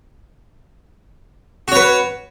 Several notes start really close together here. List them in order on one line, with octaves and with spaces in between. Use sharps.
F#4 C#5 B4